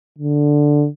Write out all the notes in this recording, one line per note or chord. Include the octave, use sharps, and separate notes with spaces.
D3